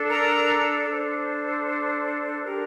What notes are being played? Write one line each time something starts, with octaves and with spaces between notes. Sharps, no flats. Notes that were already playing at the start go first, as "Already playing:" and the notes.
Already playing: D4 A4
A#4 A#5
D4 A4 C5
D4 G4 A#4